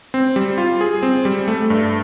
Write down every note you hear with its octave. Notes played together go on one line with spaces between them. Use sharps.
C4
G3
F4
G#4
C4
G3
A3
G2